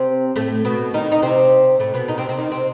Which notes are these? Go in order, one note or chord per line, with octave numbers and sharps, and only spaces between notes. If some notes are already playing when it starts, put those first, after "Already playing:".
Already playing: C3 C4
A2 A3
B2 B3
D#3 D#4
D#4
C3 C4
A2 A3
B2 B3
D#3 D#4
C3 C4
C3 C4
D#3 D#4
C3 C4